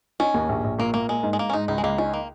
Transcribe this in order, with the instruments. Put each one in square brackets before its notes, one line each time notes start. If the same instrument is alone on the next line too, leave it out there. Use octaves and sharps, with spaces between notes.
[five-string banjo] C#4 [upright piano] D#4
[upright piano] D#2
A#1
A#1
[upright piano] A#2 [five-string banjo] A#3
[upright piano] A#2 [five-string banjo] A#3
[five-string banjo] G#3 [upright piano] A#3
[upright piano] G#2
[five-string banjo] G#3
[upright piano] G#2 [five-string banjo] A#3
[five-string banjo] C#4
[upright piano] G#2 [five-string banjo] D#4
[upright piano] C#2 [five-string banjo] D#4
[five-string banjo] G#3
[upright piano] C#2 [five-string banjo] A#3
[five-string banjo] C#4 [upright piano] D#4
[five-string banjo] A#3